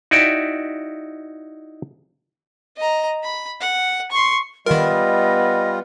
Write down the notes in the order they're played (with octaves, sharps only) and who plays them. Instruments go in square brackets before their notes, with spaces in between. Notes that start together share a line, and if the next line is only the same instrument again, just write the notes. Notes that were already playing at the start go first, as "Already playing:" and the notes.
[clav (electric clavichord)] D#4 E4 F#4 D5 E5 G5
[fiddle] D#5 A#5
B5
F#5
C6 C#6
[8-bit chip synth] D#3 A#4 [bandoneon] G3 F4 [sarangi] B3 [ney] D#5